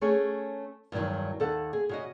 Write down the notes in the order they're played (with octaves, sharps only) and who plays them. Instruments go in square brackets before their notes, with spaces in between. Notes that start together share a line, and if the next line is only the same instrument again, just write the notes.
[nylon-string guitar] A3 C#4 G#4 C#5
E2 G2 A#2 D#3 F#3
D#2 A4 F#5
G#4
C#3 F#4 D#5